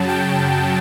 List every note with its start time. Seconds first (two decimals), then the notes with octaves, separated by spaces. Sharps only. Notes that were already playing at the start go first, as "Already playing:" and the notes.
Already playing: F#2 C#3 F#3 A5
0.09 G5